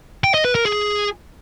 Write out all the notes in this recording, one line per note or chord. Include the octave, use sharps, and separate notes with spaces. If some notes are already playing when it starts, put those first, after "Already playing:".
G5
D#5
B4
A#4
G#4